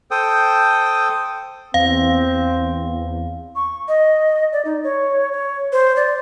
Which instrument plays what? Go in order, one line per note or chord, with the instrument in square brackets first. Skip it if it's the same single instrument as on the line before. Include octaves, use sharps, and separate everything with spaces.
[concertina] A4 C5 G5 D#6
[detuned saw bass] E2 [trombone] C4 [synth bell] F5
[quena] C#6
D#5
D5
D#4
C#5
C#5
C5
D5